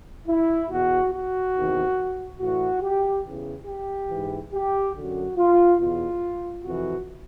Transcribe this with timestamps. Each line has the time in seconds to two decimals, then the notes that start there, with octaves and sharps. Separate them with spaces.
0.28 E4
0.70 E2 B2 F#4
1.13 F#4
1.55 E2 C3 D#3
2.40 A2 E3 F#4
2.82 G4
3.25 E2 C#3 E3
3.67 G4
4.10 G#2 E3
4.53 G4
4.95 F#2 D3 F#4
5.37 F4
5.79 E2 B2 F4
6.65 F2 C3 E3 F#4